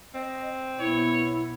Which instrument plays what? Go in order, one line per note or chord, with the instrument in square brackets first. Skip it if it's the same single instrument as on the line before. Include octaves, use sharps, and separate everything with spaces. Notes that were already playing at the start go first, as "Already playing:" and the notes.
[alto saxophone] C4 [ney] D#5
[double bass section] B1 B3 [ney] E4 [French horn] C#5